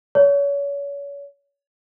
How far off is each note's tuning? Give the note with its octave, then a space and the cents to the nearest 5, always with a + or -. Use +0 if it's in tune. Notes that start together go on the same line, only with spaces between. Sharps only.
C#5 +35